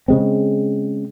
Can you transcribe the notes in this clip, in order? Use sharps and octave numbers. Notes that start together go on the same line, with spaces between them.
C#3 G#3 C4